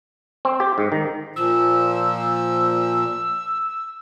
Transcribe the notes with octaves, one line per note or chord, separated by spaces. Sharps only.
C4
G4
G#2
D#3
A#2 F3 E6